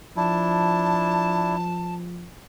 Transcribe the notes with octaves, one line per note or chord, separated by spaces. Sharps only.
F3 D4 E4 A5